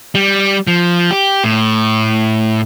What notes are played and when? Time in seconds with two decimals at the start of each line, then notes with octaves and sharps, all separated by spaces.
0.15 G3
0.67 F3
1.11 G4
1.44 A2